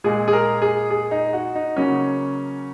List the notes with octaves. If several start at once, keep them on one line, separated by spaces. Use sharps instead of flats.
A#2 G#3 G#4
G#4
A#4
G#4
G#4
D#4
F#4
D#4
C#3 F#3 A#3 C#4